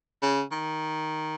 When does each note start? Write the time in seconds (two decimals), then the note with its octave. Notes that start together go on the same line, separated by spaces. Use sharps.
0.23 C#3
0.52 D#3